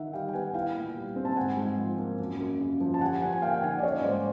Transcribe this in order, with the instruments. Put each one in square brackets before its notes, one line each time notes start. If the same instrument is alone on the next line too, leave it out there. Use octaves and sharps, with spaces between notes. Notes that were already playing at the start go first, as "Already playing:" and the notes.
Already playing: [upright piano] D#3 D#4 [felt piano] E5 F#5
[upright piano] G3 [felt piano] F5 G5
[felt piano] G5
[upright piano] B3 [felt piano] F#5 G#5
[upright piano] E4 [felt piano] F5 G5
[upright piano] A#2
G3
C4
[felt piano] A5
[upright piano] G#2 [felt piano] F#5 G#5
[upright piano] G#2
F3
A#3
F#2
F#2
C#3
F3
[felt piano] A5
[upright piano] G4 [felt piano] F#5 G#5
[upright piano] F3 [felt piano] F#5 G#5
[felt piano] G#5
[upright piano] A#3 [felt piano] F5 G5
[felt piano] G5
[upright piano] D#4 [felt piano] F#5 G#5
[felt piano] D5
[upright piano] C#4 [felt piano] C#5 D#5
[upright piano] G#2 [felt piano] C5 D5